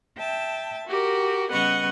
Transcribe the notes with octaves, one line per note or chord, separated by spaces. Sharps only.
E5 G5 A5
F#4 G4 A#4
C#3 G3 B3 D#5 F#5 C#6